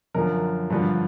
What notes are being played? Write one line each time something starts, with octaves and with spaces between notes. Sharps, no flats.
F#2 D3 F3 A#4
G2 D3 F3